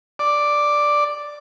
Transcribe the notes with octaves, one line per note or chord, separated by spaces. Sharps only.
D5